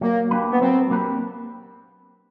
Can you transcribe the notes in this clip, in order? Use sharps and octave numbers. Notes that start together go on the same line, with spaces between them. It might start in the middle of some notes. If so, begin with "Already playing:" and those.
F#3 A#3
A#3 D4 G4 B4
B3
F#3 C4
A#3 D4 G4 B4